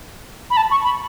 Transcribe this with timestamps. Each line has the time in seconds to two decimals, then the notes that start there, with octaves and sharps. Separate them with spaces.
0.50 B5
0.57 A5
0.71 C#6
0.84 B5